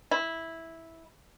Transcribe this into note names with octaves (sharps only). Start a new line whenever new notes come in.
E4